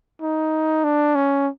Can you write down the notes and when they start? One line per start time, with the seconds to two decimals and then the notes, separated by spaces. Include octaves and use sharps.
0.22 D#4
0.84 D4
1.15 C#4